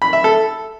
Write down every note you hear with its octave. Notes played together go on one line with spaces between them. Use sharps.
B5
E5
A4